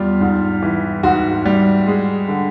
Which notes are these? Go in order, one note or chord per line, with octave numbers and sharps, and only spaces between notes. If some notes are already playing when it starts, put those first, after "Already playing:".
Already playing: E2 G3 F4
G#2
E3
G#2 F#4
G3
G#3
D3